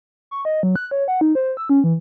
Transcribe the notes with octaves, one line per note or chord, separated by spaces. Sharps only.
C#6
D#5
F#3
F#6
C#5
F#5
D#4
C5
E6
C#4
E3